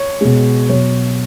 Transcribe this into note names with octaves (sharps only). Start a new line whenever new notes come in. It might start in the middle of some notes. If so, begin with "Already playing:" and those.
Already playing: C#5
B2 G#3
B2 F#3 C#5